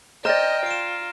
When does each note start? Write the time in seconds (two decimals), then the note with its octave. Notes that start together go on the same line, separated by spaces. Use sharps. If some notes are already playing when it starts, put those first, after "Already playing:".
0.25 C5 D5 D#5 G5 A#5 F6 A#6
0.66 F4 D7 E7